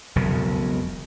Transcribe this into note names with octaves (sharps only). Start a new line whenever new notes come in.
E1 B1 F2 C#3